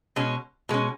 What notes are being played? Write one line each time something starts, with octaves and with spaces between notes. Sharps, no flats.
B2 G#3 C#4
B2 G#3 C#4